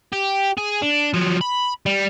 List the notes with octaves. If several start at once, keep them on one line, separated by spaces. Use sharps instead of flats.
G4
G#4
D4
F3 F#3
B5
G3